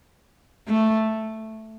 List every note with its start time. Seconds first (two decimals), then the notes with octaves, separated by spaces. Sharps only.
0.68 A3